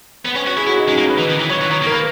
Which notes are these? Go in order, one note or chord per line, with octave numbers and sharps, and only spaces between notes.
B3 B4
C#4 C#5
F#4 C#5
E4 G#4
E4 F#4
D#4
G#3 C#4
A#3 D#4
B4
E3
D#3
E3
F#3 C#5
E3
D#3
A#3 A#4
B4